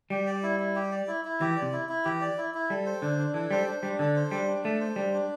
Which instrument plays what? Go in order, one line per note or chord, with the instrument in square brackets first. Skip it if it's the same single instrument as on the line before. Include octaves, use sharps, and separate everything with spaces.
[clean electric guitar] G3 [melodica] G4
[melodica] D5
E4
E4
G4
D5
E4
E4
[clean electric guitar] E3 [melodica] G4
[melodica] D5
[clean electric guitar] C3
[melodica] E4
E4
[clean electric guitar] E3 [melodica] G4
[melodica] D5
E4
E4
[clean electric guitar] G3 [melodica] A4
[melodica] C5
[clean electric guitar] D3 [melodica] D4
[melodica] D4
[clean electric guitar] E3 [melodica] A4
[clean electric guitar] G3 [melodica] C5
[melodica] D4
[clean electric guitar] G3 [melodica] D4
[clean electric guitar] D3 [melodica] A4
[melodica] C5
[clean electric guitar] G3 [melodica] D4
[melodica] D4
[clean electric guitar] A3 [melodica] A4
[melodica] C5
[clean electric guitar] G3 [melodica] D4
[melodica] D4